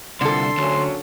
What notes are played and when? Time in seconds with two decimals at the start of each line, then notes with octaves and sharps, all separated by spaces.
0.21 C2 A#2 D3 A4 C6
0.58 D2 A#2 F#3 C#4